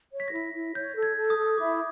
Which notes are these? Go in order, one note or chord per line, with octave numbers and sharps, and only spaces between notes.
C#5
B6
A#6
E4 B6
E4
C#5 G6
A4
G#6
A4
D#6
A4
E4 D6